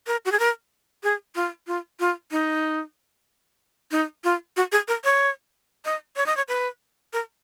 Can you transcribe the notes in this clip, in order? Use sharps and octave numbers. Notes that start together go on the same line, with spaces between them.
A#4
F#4
G#4
A#4
G#4
F4
F4
F4
D#4
D#4
F4
F#4
G#4
A#4
C#5
D#5
C#5
D#5
C#5
B4
A#4